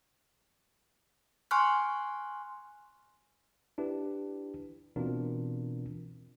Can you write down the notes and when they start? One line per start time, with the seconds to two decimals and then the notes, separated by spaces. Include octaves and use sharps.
1.51 G#5 C6 C#6 F6 F#6
3.78 D4 E4 G4 B4
4.96 B2 E3 C4 D4 F4 A#4